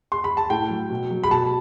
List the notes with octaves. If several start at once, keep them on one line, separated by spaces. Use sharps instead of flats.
C6
B5
A5
A2 G5
F#3
B2
F#3
B5
B2 A5